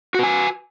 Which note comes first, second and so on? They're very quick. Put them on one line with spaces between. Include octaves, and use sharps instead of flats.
F#4 B4 G#5